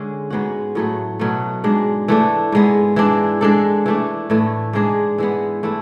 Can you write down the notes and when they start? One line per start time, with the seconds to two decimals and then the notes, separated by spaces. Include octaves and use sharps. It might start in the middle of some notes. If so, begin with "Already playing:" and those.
Already playing: D3 G#3 C#4
0.30 G#2 G#3 B3 F#4
0.75 A2 F#3 A3
1.19 B2 F#3 A3
1.64 G#2 G#3 D4
2.08 E3 A3 D4
2.52 G#2 G#3 B3
2.96 E3 G#3 D4
3.41 G#3 D4 A4
3.86 E3 A3 D4
4.30 A2 E3 A3
4.73 G#2 G#3 D4 G#4
5.18 E3 G#3 B3
5.63 E3 A3 E4